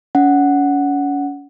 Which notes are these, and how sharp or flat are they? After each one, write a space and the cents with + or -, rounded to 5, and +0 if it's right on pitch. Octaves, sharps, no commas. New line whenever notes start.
C#4 +35 F#5 +0